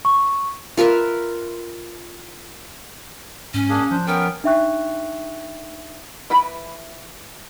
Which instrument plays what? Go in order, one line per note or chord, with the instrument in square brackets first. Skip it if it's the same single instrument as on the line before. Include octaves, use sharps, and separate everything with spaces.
[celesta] C#6
[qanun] F4 A#4 B4 E5
[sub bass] G#2 [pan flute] C#4
[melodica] A#3 D4 G#4
[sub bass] F3 [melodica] D4 C5
[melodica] B3 C#4 A#4 [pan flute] G5
[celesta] D4 D#4 E5 G5 C#6 F#6
[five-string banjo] E3 B4 B5